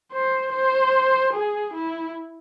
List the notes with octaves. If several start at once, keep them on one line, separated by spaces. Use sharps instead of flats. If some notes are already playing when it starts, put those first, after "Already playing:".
C5
C5
G#4
E4